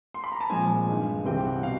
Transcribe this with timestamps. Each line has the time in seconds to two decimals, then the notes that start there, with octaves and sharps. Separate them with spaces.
0.14 C6
0.24 B5
0.32 A#5
0.41 A5
0.50 A#2 F3 G#3 C4 G#5
0.89 G2 D#3 G#3
1.25 C2 C3 E3 G3 C4 G5
1.45 F#5
1.63 B2 F5